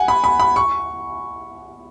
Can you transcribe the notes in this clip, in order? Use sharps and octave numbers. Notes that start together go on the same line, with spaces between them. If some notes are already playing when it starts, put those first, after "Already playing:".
Already playing: F#5 G#5
B5
B5
B5
C#6